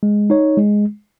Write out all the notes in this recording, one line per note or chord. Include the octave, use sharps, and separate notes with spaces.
G#3
D#4 C#5
G#3